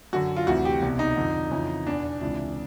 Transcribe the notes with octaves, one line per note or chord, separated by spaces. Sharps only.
F#2 D3 F#4
F4
D2 C3 E3 F#4
G4
C2 B2
D#4
F2 D3
F2 C#3 E3
E2 B2 D4
C#2 C3 E3 D4